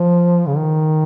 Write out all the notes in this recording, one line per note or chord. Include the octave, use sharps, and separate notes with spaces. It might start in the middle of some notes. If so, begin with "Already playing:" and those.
Already playing: F3
C#3
D#3